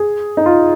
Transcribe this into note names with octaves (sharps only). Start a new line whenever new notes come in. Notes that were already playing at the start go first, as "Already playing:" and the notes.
Already playing: G#4
D#4
F4